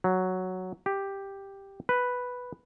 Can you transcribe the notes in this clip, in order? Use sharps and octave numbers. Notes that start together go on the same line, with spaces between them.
F#3
G4
B4